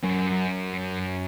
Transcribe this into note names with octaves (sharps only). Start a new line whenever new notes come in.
F#2